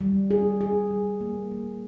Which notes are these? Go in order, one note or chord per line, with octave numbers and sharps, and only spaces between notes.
G3
G#4
G#4
G3
A#3
A#3